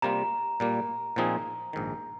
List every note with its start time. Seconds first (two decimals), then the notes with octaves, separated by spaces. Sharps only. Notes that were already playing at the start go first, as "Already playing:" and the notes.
0.02 C3 G3 A#3 F4 A#5
0.60 A#2 G3 A#3
1.16 A#2 F3 C4 D#4 G#4
1.73 A#1 G#2 D#3